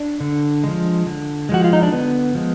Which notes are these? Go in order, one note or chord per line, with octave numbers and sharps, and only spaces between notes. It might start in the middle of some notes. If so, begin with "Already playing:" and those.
Already playing: D4
D3
F3 G#3
D3
F3 G#3 F#4
F4
D#4
D4
D3 B3
F3 G#3